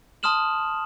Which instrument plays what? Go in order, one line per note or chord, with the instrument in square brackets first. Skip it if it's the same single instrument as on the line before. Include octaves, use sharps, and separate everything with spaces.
[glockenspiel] A5 C6 D#6 F6 E7 F#7